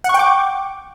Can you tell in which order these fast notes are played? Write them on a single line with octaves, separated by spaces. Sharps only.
F#5 C#6 G5 D6